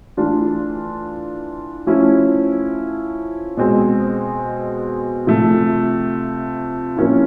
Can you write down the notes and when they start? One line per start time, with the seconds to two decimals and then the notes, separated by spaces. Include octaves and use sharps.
0.17 E3 A3 D4 F4
1.87 F3 A3 C#4 E4
3.57 B2 G#3 C4
5.27 C3 F3 A3
6.97 F3 A#3 C#4 E4